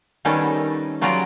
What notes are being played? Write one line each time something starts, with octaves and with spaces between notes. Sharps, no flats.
D#3 G3 B3 C#4 D#4 A4
C#3 F#3 F4 G4 D5 A#5